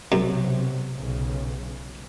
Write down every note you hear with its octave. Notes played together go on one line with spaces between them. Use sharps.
B1 F#2 C3 F#3
B1 C#3